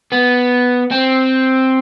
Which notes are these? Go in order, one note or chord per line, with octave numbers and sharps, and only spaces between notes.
B3
C4